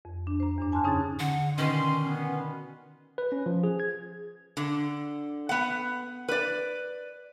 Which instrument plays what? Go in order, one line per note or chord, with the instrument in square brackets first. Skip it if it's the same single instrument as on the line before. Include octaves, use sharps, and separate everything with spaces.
[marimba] F2
D4
C5 A#5
E2 G2 D4
G#5 A5 C6 F6 F#6
C#3 C#4 D#4 G#4 G#6 A6
[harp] D3 [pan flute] F#5
[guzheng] B2 D#3 [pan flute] C#4 [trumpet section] C6
[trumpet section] B3 [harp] G#5
[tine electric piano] B4
C#4
F3
G#4
G#6
[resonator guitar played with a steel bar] D3
B3 F#5
B4 D5